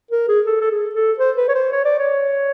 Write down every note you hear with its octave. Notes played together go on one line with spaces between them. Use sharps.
A#4
G#4
A4
A4
G#4
A4
C5
B4
C#5
C5
C#5
D5
C#5